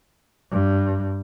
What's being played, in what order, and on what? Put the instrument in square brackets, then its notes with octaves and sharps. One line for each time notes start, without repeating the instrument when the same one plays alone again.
[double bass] G2